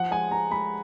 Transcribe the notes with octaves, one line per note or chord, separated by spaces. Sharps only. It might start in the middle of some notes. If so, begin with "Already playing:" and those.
Already playing: F3 F#5
G#3 G#5
G#3 A#5
G#3 B5